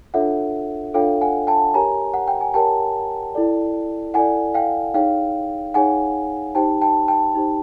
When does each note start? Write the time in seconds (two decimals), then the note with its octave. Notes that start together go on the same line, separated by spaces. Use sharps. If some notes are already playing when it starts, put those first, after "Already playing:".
0.14 D4 F4 A4 C#5 E5 F#5
0.94 D4 F4 A4 C#5 F5 G5
1.21 F#5 G#5
1.47 G5 A5
1.74 G4 A#4 C#5 G#5 A#5
2.14 F#5
2.27 G5
2.41 G#5
2.54 G4 A#4 C#5 G5 A5
3.35 E4 A4 D5
4.14 E4 A4 D5 F#5 G#5
4.54 F5 G5
4.94 D#4 G#4 C#5 F5 G5
5.74 D#4 G#4 C#5 F#5 G#5
6.55 D#4 G4 C5 G5 A5
6.82 G5 A5
7.08 G5 A5
7.35 D#4 G4 C5